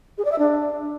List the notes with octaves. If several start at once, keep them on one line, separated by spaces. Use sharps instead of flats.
G#4
D5
E5
D4